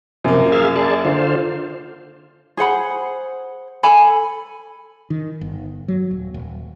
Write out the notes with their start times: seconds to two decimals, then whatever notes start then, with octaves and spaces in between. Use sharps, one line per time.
0.25 F#2 C3 F3 A#3
0.52 G#4 E5 F5
0.76 G#4 D5 A5
1.05 D3 F4 C5
2.57 G#4 C5 F#5 B5
3.83 A4 G#5 B5
5.10 D#3
5.41 G1
5.88 F#3
6.11 D#1
6.34 D#1